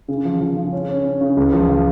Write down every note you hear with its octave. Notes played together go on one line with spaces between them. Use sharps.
C#3
F3
F3
C#3
C#4
C#4
C#4
C#3
C#2
F3
F3